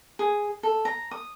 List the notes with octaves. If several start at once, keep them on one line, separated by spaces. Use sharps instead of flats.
G#4
A4
A#5
D#6